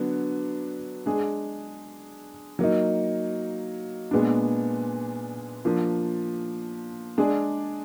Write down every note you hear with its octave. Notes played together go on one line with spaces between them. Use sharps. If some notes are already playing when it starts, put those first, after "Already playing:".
Already playing: D3 F#3 B3 D4
G#3 D4 G#4
F#3 A#3 D#4
A#2 G#3 B3 D4
F3 A#3 D4
G#3 D4 G#4 D5